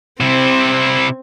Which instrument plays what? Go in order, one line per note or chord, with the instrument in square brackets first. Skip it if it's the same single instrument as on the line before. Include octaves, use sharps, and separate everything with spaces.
[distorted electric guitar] C3 E4 [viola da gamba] C4